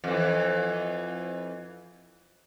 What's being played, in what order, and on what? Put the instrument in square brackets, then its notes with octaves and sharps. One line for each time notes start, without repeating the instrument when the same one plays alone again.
[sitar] F2 E3